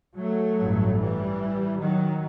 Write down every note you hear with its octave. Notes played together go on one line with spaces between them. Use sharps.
F#3 A3
A1 G2
E3 G3
D#3 F#3